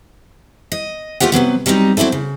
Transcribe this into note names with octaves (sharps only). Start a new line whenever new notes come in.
D#5
A3 C4 F4 G4 F#5
C3 E3 F#3 B3
F#3 G3 C4 C#4 D#4
F#3 C4 D4 E4 A4
C#3